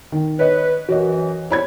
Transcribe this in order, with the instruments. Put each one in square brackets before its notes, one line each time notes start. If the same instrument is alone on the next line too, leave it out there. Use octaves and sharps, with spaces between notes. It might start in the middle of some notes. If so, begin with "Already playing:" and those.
[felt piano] D#3
[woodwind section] B4 [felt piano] C#5 D#5
[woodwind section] F#2 E3 [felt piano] F#4 C#5 D#5
[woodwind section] G3 C4 E4 [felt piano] C#5 B5 G#6